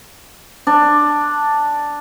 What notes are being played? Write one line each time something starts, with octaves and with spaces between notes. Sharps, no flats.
D4